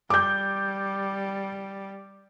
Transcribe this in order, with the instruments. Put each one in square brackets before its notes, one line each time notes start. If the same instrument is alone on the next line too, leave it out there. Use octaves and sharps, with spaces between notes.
[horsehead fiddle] G3 [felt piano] D6 G6